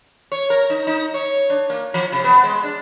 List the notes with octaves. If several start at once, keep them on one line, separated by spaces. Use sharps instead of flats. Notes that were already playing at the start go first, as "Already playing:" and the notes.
C#5
A#4
D#4
D#4
C#5
D4
A#3
F3
C3
B3
G#3
D4